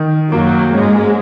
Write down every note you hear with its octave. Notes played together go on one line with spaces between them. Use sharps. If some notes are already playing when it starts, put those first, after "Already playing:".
Already playing: D#3
F#2 F#3 A#3
G#2 G#3 C#4